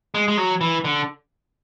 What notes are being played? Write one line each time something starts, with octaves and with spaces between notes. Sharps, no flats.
G#3
G#3
F#3
E3
D3